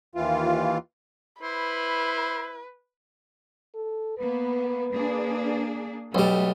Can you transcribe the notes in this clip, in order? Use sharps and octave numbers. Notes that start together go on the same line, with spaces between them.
D#2 E3 F4
E4 B4 C5
A4
A#3 B3 B4
A#3 D4 G#4
B1 G3 A3